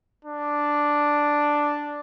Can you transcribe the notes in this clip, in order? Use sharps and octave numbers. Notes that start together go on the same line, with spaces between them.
D4